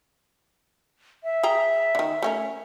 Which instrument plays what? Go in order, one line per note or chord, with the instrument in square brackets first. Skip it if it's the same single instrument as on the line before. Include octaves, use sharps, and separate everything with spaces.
[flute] E5
[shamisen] G#4 G5 A#5
D3 D#3
A3 C#4 A#4